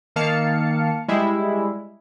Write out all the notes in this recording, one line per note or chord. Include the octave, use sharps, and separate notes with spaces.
D#3 A#3 F5 A5 C#7
G3 G#3 E4